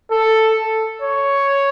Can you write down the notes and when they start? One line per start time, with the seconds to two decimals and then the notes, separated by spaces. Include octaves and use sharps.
0.11 A4
1.02 C#5